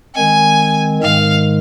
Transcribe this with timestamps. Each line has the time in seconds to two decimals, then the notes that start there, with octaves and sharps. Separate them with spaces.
0.15 D#3 G#3 C4 G#5
1.02 G#2 D#3 G#3 F5